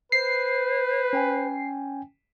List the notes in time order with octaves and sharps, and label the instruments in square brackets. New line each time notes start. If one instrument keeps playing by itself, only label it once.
[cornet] B4 [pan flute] C5 [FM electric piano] C7
[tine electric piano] C#4 G5 G#5